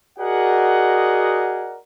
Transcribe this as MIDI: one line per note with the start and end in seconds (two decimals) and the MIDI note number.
0.19 1.78 66
0.19 1.78 68
0.19 1.78 70
0.19 1.78 74
0.19 1.78 75
0.19 1.78 78